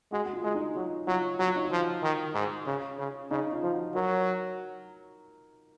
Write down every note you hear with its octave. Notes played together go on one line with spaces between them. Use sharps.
G#3 F#4
F#4
F4
G#3
D#4
F#3 F4
F#3 F4
F#3 F#4
F4
D#4
F4
F3
D#3
G#2
C#3
C#3
C#3 D#4
F4
F3
F#4
F#3 A#4